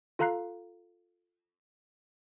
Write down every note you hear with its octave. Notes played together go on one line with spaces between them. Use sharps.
F4 A4 F5 A#5 F#6 C7